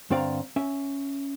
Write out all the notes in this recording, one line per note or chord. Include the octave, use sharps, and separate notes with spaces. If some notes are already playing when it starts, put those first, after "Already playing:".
G2 D3 C4 D5 F5 A#5
C#4 E5